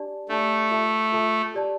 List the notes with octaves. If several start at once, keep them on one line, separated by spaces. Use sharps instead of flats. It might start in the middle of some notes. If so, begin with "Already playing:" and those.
Already playing: D4 G4 D5 A5
A3 D4 G4 D5 A5
F4 A4 E5 A5
F4 A4 E5 A5
G4 D5 A5